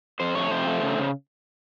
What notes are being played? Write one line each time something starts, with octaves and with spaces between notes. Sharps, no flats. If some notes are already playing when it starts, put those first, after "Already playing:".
F2 C5
A3 C#5
F2 C5
A3
C#3
C#3